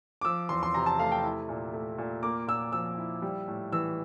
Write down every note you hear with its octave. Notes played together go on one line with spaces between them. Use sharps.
D6
F3 E6
E2 C6
C6
C3 A#5
A5
A3 F5
G5
E4
A#2
A3
A#2
A#3 D6
A#2 E6
F3 E6
E4
G3
A2
E3 E6